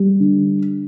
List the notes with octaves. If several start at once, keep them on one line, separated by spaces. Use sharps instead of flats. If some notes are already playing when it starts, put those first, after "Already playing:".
Already playing: G3
D3